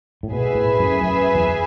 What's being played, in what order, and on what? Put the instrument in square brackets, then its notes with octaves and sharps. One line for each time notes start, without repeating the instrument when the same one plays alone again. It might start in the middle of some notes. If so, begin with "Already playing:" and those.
[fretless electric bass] A2
[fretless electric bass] B2 [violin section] G#4 B4 E5 G#5
[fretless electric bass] A2
F#2
F#2
E2